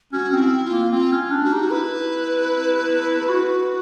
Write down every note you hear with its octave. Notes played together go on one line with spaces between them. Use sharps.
C#4 F#4
C4
E4
F4
A#3
C4 F4
C#4
D4
F#4
D#4 G4
F#4
E4 B4
F#4